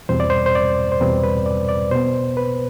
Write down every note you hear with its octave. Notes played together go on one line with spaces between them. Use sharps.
E2 B2 G3 C4 C5
D5
C5
C5
D5
C5
E2 B2 G3 C4 B4
B4
D5
D5
B2 B3 C5
B4